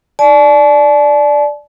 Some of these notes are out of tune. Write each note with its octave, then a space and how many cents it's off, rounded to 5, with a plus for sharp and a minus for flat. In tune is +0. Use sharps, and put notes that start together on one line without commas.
D5 +0 A5 -40